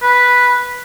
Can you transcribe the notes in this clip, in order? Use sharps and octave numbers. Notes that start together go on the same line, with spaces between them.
B4